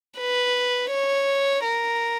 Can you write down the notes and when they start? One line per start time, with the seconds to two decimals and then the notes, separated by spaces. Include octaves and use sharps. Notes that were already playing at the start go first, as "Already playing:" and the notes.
0.19 B4
0.91 C#5
1.64 A#4